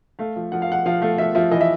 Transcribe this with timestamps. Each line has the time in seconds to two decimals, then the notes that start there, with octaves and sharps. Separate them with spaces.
0.19 A3 F5
0.36 F3
0.52 F3 F#5
0.62 F5
0.69 F3 F#5
0.86 F3 F5
1.02 A3 F5
1.18 F3 E5
1.35 F3 E5
1.51 E3 D#5
1.61 E5